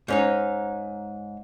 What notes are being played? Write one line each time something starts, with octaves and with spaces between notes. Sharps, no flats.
G#2 C#4 D#4